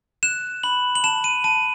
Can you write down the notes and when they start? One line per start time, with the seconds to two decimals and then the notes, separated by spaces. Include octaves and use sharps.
0.23 F#6 E7
0.63 B5 F#7
0.95 F#7
1.04 A5 E7
1.24 D#7
1.44 A5 D#7